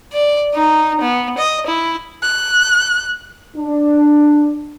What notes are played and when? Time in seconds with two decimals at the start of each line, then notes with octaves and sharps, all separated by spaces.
0.13 D5
0.54 D#4
1.01 B3
1.38 D#5
1.66 E4
2.23 F#6
3.57 D4